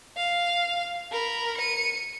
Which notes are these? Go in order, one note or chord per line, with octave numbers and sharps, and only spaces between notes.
F5
A#4 B5
C#7 D#7